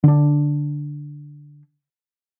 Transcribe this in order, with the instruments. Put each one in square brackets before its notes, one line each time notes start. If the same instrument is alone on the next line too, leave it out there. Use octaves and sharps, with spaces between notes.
[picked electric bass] D3 D4